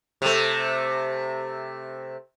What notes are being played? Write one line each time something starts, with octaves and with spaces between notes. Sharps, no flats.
C3 A3